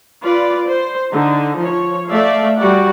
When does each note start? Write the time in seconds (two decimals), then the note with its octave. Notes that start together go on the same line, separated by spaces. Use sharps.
0.24 F4 B4 D5
0.69 C5
1.12 D3 D#4
1.59 F3 C#5
2.10 A3 D5 E5 F5
2.58 G3 F#4 D5 F#5